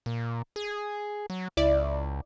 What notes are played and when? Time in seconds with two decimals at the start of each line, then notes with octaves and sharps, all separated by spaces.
0.06 A#2
0.56 G#4
1.30 F#3
1.57 C#2 E4 D5